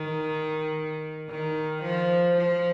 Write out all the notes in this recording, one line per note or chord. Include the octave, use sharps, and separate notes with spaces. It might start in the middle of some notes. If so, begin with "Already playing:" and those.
Already playing: D#3
D#3
F3
F3